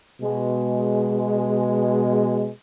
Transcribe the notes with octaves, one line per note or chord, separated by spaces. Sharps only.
B2 G#3